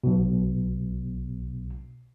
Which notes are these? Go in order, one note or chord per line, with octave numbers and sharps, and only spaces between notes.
B1 B2